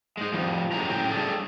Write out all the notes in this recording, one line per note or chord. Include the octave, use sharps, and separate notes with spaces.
G#3 D#4
F3 G3 C4
F#2 A2 C#3 G4 G#4 A#5
A2 C#3 G5
G3 A3 D4 G#4 A4